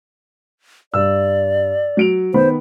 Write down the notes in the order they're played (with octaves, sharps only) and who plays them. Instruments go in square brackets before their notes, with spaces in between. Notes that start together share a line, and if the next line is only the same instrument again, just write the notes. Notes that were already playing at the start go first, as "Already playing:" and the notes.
[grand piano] G2 E6 [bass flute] D5
[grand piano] F#3 D7 F7
[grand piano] D#3 B3 B5 [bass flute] C5